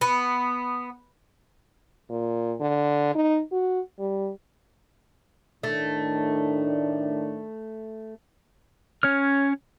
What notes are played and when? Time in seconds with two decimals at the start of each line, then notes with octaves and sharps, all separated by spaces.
0.01 B3
2.10 A#2
2.61 D3
3.15 D#4
3.52 F#4
3.99 G3
5.63 A2 D#3 A3 D4
9.03 C#4 C#5 F6